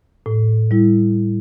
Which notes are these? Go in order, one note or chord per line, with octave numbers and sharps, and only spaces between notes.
A2
G3 E4